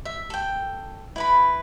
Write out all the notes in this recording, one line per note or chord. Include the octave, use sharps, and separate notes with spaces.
E5
A4 G5
E4 B4 B5